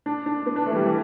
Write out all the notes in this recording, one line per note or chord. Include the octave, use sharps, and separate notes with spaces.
D4
D4
B3
D4
A3
E3
G3
E3